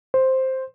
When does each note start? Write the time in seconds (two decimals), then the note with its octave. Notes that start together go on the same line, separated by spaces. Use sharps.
0.14 C5